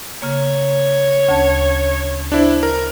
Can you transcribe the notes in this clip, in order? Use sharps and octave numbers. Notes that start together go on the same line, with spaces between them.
C#3 A#3 C#5
D2 C#4 A5
D4 E4 C5
A#4